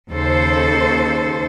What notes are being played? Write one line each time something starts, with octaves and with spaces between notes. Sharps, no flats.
D#2 C#3 A4 C5